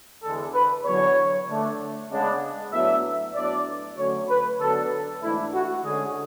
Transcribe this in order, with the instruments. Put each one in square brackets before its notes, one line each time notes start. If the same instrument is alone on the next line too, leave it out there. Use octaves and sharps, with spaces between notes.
[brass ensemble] E2 D3 G#3 D4 A4
B4
E2 D3 F#3 C#5
D3 A3 D4
C#3 G#3 B3 D4
A2 F#3 B3 D4 E5
A2 F#3 B3 D4 D5
D3 F#3 A3 C#4 C#5
B4
D3 F#3 B3 D4 A4
G#2 E3 A3 D4 E4
F#4
D3 G#3 C#4 G#4